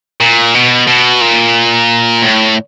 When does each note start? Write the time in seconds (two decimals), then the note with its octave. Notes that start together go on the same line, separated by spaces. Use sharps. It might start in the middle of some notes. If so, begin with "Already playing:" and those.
0.20 A#2
0.54 B2
0.87 B2
1.21 A#2
2.22 A2